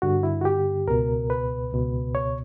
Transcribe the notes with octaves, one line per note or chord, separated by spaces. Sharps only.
G2 D3 F#4
E4
F#4
G4
C#2 B2 A#4
B4
C#2 B2
C#5